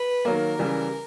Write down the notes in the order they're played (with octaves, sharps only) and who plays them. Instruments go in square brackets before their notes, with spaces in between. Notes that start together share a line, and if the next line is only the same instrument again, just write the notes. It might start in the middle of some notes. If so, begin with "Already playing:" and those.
Already playing: [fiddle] B4
[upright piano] D#3 F#3 A#3 [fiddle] A#4
[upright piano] C#3 E3 G3